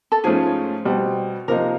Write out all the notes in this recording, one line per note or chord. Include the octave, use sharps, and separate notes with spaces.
A4
G#2 F3 A3 C#4 G#4
B2 G3 C4
C3 F3 A#3 D#4 A#4